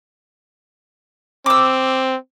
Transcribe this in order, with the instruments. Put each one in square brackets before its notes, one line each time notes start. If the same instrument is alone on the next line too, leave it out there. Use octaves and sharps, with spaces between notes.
[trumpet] C4 [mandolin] D6 E6